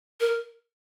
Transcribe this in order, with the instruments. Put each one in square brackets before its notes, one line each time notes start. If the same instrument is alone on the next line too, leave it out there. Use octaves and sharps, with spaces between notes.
[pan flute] A#4